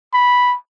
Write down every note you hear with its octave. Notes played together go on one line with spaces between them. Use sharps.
B5